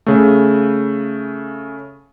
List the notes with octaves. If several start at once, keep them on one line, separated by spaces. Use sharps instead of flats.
C#3 A3